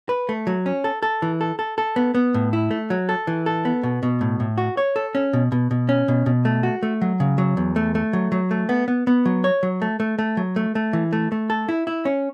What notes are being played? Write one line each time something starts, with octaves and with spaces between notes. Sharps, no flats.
B4
A3
F#3
C#4
A4
A4
E3
A4
A4
A4
B3
B3
A2
E4
A3
F#3
A4
E3
A4
B3
B2
B2
A2
A2
F#4
C#5
A4
C#4
B2
B2
B2
C#4
B2
B2
A3
F#4
A3
F#3
C#3
F#3
E2
A3
A3
F#3
F#3
A3
B3
B3
B3
F#3
C#5
F#3
A3
A3
A3
F#3
A3
A3
E3
A3
A3
A4
E4
E4
C#4